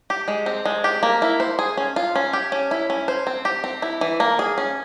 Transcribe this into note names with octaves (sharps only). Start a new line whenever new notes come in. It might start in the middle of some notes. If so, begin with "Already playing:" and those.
G4
G#3
C4
G#3
G4
A#3
E4
C5
G#4
C#4
F4
C#4
G4
C#4
E4
C#4
C5
C4
G4
C4
E4
E3
A#3
G#4
C#4